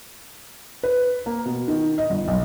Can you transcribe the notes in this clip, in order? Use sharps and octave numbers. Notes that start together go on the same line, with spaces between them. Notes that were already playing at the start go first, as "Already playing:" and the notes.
B4
A#3
B2
D#3
D#5
G1
B1